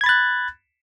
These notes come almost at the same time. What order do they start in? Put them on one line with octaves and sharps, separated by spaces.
G#6 B5 A6 F#6